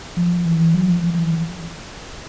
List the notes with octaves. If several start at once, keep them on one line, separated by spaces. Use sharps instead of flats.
F3
E3
F#3
F3
F3
F3
E3